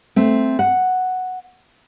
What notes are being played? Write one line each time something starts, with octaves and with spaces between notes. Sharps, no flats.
A3 C4
F#5